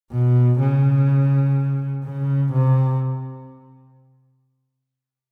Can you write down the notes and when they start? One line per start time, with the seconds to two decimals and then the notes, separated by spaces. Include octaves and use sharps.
0.12 B2
0.60 C#3
2.05 C#3
2.53 C3